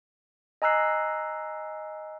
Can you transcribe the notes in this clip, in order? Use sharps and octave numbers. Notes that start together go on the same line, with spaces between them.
D#5 G#5 A#5 E6 F#6 C7